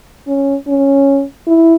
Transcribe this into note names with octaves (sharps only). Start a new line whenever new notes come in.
C#4
C#4
E4